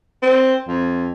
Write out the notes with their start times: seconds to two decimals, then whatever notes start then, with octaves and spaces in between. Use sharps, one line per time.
0.22 C4
0.68 F2